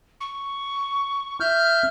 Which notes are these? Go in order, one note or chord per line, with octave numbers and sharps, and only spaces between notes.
C#6
E5 F6 G6